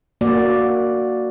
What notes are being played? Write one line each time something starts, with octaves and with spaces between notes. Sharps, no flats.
A#3 F#4 D5